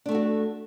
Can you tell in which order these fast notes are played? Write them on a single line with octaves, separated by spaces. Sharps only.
D4 A3 A4 F#4